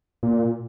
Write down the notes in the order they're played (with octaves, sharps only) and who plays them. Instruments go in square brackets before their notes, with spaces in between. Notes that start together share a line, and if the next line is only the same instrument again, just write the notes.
[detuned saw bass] A#2